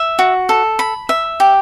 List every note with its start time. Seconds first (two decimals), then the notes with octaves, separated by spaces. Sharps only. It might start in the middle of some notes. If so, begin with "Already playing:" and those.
Already playing: E5
0.19 F#4
0.49 A4
0.79 B5
1.09 E5
1.40 G4